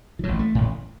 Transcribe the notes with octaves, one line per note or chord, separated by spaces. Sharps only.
E3
A1 A2 F#3
A3
A1 A2